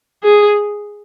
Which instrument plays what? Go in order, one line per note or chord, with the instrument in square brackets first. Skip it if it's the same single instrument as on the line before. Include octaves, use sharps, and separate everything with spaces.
[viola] G#4